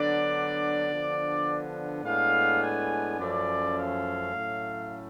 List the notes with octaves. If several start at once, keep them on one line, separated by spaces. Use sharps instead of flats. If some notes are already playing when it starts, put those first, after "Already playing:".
Already playing: D3 F#3 B3 D4 D5
D3 F3 B3 D4
A2 G#3 B3 D4 F5
G#5
F#2 F3 A3 C#4 D5
F5
A2 F#3 A3 C#4